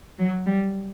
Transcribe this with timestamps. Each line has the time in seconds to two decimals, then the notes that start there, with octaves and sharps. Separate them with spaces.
0.19 F#3
0.46 G3